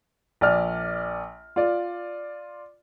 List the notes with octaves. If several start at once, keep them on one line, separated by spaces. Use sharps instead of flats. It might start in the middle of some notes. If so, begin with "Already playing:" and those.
A#1 D5 F6
F4 D5